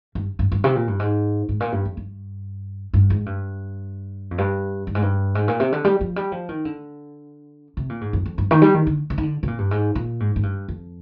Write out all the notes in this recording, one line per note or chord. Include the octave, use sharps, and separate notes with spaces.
G2
G2
G2
C3
A#2
G2
G#2
G#2
A#2
G2
F2
G2
G2
G#2
G2
F2
G2
G2
G#2
G2
G#2
A#2
C3
D3
G3
F3
G3
F3
D#3
D3
C3
A#2
G#2
F2
F2
G2
D#3
G3
D#3
D3
C3
D#3
D3
C3
A#2
G2
G#2
A#2
G#2
G#2
G2
F2